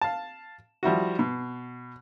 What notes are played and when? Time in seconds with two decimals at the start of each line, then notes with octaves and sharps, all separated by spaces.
0.01 F5 A5
0.83 F3 G3 E4 F#4
1.19 B2